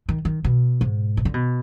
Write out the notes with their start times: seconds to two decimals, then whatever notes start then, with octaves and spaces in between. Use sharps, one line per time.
0.09 D#3
0.25 D#3
0.44 B2
0.81 G#2
1.17 B2
1.25 D3
1.34 B2